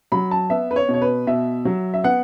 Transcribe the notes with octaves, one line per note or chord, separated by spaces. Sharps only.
F#3 B5
A5
B3 E5
B4
C#5
B2
C#5
B4
B2 E5
F#3
E5
B3 F#5